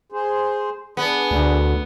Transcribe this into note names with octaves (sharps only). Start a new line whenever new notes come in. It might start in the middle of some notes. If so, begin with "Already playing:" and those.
G#4 C5
B3 D4 G#4
D2